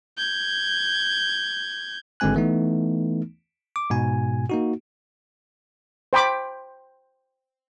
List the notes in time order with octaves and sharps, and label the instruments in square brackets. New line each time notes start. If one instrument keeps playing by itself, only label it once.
[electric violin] G6 G#6
[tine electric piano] G#1 D3 G#3 C4 G#5 F#6
E3 A3 B3 D#4
D6
G#2 B2 G#5
A#3 D#4 F#4
[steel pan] C5 G5 B5 D6